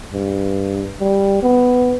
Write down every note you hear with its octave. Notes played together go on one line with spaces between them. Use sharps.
G2
G3
B3